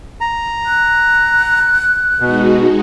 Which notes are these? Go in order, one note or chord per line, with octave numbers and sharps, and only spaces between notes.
A#5
F#6
B2 G#3 D#4 F#4